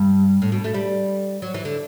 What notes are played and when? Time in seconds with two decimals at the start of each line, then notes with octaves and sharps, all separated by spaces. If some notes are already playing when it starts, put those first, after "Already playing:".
Already playing: G2
0.42 A2
0.52 B2
0.64 A3
0.74 G3
1.42 F#3
1.54 E3
1.65 D3